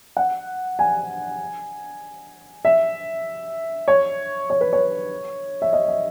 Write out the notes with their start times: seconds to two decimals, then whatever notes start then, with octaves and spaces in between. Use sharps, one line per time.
0.17 F#5
0.79 G#5
2.65 E5
3.88 C#5
4.50 C#5
4.61 B4
4.73 C#5
5.62 E5
5.73 D#5
5.88 E5